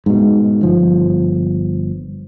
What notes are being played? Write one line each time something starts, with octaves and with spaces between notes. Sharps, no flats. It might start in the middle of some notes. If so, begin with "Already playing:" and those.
G#2 B2
G1 F3